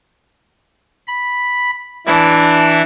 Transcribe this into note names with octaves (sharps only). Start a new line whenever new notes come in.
B5
E3 D4 E4